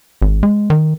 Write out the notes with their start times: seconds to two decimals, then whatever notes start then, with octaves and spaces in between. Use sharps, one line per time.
0.22 G#1
0.43 G#3
0.70 D#3